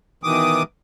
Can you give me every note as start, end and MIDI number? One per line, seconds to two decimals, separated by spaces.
0.24 0.63 47
0.24 0.63 51
0.24 0.63 52
0.24 0.63 86
0.24 0.63 87